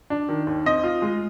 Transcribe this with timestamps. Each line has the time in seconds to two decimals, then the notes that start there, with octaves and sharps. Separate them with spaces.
0.10 D4
0.29 D#3
0.47 D#2
0.66 C4 D#5
0.84 F4
1.02 G#3